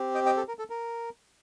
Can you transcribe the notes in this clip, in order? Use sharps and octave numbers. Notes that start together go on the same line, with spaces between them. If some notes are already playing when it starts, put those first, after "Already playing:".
Already playing: C4 G4
D#5 G5
D#5 G5
A4
A#4
A4
A#4